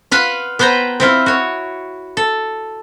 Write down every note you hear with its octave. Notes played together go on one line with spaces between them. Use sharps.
F4 B4 F5 F#5
B3 B4 C5 G5 A#5
C4 E4 F4
F#4 C#5
A4